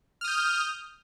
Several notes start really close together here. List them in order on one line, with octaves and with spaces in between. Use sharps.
F6 D#6 G6